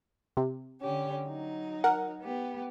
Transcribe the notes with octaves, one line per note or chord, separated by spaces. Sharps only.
C3
D3 C#4 G4
F#3 D#4
A#4 F#5
B3 G4